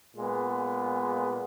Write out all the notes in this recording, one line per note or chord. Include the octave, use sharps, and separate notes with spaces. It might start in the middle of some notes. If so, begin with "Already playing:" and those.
A#2 G#3 B3